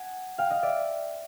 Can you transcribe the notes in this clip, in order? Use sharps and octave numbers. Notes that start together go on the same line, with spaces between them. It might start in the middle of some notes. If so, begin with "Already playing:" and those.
Already playing: F#5 G#5
F5 G5
D#5 F5
D5 E5